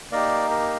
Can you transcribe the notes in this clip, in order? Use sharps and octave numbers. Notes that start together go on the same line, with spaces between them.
A#3 D#4 G4 A#4 D5
A#4